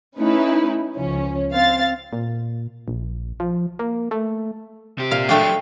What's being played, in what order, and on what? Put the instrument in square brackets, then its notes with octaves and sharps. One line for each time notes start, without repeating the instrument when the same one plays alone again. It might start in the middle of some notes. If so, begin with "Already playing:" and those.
[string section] A3 C#4 D#4 E4 B4
C#2 F3 C#4
C4 F5 A6
[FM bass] A#2
A#1
F3
A#3
A3
[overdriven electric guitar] C3 G4
[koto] A#2 F5
[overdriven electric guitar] F#3 G#3 [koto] A3 D4 [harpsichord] F5 G5